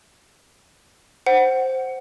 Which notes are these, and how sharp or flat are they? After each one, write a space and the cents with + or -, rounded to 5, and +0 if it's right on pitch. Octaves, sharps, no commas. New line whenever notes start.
C5 +0 F#5 +15